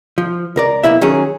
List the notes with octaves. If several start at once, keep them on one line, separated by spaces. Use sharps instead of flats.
F3
C#2 A#4 D5
B1 B2 A#3 E4 E5
D#3 F#3 C#4 G#4